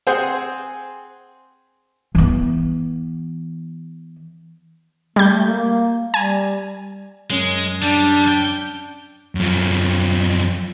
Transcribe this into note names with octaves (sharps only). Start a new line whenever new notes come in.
C4 G#4 C5 F#5 G#5
E3 B3
G3 A3 G6
A#3
G3 G#5
F#2 G#3 C#4
G3 D4
G5
F#2 F3